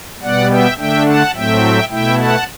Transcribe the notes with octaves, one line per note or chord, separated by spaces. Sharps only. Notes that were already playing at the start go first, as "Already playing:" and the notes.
B2 G3 B3 D5 F#5
E5 G5
D3 A3 D4 E5 G5
F#5 A5
A2 F#3 A3 C4 E5 G5
B2 A3 E4 E5 G5
F#5 A5